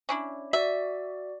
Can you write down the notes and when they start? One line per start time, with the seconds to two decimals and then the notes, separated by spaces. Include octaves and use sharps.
0.09 C#4 D4 E4
0.53 F#4 D5 E5